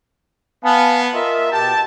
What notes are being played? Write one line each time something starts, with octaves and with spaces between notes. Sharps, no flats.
B3 F5 G#5 A5
F4 A#4 D#5 E5
B2 G4 G5 A5